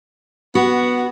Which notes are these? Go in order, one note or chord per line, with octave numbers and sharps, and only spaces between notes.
B3 F#4